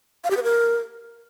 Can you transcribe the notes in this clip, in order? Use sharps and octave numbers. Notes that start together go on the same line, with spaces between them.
F5
G4
B4
A#4